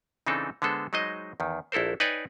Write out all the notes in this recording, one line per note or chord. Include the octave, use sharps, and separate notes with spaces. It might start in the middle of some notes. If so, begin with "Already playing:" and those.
C#3 E3 C4 D4 D#4 A4
D3 G#3 B3 A4 C5
F#3 G#3 D#4 C5 D#5
E2 D#3
A#1 E4 A4 A#4 C5
D#4 B4 C#5 D5 G5 G#5